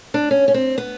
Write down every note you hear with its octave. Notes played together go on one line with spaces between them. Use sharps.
D4
C#4
C#4
C4
B3